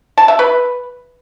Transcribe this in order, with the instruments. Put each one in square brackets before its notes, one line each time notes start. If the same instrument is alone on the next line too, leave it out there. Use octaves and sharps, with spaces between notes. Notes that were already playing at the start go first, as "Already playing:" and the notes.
[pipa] A5
E5
B4